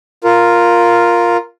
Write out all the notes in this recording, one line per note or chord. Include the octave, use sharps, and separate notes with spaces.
F4 A#4